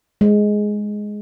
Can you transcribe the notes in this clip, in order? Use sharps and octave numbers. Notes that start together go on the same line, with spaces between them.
G#3